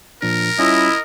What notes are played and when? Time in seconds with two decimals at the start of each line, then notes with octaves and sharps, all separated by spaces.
0.22 A#2 F3 D4 A#4
0.59 G3 C#4 E4 F4 D#5